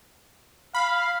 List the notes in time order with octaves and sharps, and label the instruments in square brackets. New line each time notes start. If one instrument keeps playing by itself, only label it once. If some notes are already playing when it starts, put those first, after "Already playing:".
[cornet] F5 [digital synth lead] B5